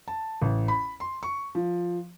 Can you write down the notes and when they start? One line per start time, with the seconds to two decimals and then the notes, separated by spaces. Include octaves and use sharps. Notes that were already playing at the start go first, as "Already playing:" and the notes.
0.08 A5
0.42 A1
0.68 B5
1.00 C6
1.23 C#6
1.55 F3